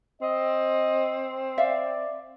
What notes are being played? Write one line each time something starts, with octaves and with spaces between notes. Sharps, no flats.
C4 D#5
D5 E5 F5